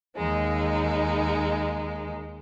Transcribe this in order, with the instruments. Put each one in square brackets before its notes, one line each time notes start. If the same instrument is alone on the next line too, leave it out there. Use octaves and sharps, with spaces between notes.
[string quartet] D#2 G#3 D#4